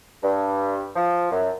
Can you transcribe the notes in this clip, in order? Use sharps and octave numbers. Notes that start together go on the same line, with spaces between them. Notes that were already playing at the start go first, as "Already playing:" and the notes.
G2
F3
F#2